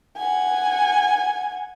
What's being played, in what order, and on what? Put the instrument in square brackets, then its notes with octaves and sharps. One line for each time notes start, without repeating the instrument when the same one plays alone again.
[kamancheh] F#5 G#5